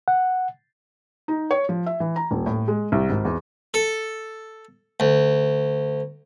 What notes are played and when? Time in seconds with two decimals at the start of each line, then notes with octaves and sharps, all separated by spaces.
0.08 F#5
1.28 D#4
1.51 C#5
1.69 F3
1.86 E5
2.00 E3
2.16 A#5
2.31 D#1
2.46 A2
2.68 G#3
2.92 C2
3.09 G#1
3.25 E2
3.74 A4
5.00 D2